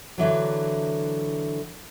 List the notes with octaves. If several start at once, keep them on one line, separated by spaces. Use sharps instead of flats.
D3 E3 F#3